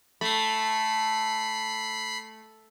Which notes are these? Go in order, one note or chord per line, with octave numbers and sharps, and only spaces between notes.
A3 B5 C7